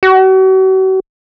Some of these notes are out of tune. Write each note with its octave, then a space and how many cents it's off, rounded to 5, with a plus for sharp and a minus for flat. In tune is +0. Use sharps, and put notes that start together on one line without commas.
F#4 +40